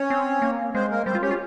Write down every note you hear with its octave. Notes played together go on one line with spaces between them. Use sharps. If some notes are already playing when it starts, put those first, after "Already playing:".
Already playing: C#4 C#5
C4
A#3
G#3 C4 C5
A#3 A#4
G3 C4 C5
F4
C#4 G4 C#5
F4